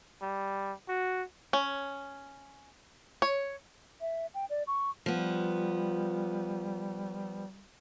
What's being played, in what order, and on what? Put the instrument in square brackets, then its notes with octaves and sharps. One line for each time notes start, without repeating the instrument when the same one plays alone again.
[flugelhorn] G3
F#4
[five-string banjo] C#4
C#5
[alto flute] E5
G5
D5
C#6
[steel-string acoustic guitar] F3 B3 [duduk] G3